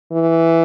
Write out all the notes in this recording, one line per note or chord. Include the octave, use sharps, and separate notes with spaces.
E3